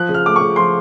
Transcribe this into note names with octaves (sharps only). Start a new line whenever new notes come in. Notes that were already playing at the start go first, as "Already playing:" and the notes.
Already playing: F3 F#6
C#3
F6
A3 D6
C#3 C#6
F3 C6